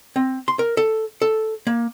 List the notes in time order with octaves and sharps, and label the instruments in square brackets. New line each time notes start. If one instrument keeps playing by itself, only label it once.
[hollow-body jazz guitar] C4
C6
A#4
A4
A4
A#3